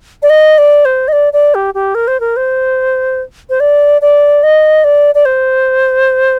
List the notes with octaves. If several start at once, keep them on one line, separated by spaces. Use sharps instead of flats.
D5
D#5
D5
C5
D#5
D5
D5
G4
G4
A#4
C5
A#4
C5
C5
D5
D5
D#5
D5
D5
C5